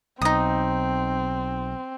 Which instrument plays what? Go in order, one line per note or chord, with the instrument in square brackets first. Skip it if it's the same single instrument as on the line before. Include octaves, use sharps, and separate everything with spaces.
[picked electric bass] B1 [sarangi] C4 [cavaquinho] D#4 D#6